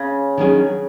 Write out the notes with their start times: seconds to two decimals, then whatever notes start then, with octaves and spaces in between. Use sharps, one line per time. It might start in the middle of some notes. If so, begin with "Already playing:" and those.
Already playing: C#3
0.38 D#3 F#3 C#4 G#4